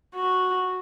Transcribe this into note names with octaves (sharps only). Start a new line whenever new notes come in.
F#4